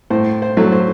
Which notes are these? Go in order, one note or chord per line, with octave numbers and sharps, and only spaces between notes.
A2 C5
C5
F#3 A3
C5